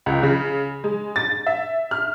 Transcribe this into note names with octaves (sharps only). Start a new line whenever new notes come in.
C#2
C#3
G#3
A6
E5
F6